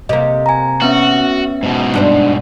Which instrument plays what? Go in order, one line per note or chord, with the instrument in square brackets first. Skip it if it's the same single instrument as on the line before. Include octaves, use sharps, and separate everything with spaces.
[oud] C3 A#3 [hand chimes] D#5
[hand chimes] G#5 A#5
[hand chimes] B3 C#4 E5 [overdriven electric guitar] F#4
[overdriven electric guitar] G#2 B2
[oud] G2 D4 C5